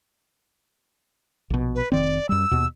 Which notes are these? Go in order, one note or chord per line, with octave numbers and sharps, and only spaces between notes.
A#1 B2
B4
F1 D#3 C4 D5
F#2 G3 E6
D#2 B2